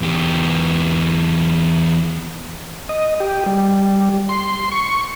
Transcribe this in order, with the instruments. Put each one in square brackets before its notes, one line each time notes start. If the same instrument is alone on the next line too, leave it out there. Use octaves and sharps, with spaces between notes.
[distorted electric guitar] E2 G4
[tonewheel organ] D#5
G4
G3
C6
C#6